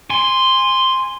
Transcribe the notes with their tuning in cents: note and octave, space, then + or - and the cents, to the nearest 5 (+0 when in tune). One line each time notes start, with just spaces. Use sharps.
G#5 -15 C6 +0